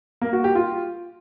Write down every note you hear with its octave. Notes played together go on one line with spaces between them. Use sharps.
A#3
F#4
G4
F4